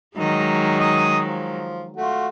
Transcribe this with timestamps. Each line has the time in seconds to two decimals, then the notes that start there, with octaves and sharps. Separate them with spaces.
0.18 D#3 F#3 G#3 D#5
0.80 D#5 D#6
1.25 F3
1.97 A3 F4 F#4